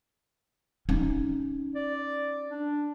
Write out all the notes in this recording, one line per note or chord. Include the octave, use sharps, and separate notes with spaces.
C#4 D#4
D5
D4